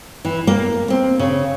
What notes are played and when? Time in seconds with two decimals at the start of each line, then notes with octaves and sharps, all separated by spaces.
0.25 E3
0.47 A#3
0.90 C4
1.19 C#3